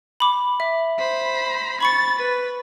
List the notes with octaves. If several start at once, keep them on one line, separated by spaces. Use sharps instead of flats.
B5 D6
E5
C5 B5
B5 C#6 A6 C#7
B4